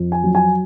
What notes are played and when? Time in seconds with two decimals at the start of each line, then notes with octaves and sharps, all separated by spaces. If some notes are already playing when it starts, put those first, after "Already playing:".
Already playing: F2
0.12 G#5
0.23 F#3
0.35 G#5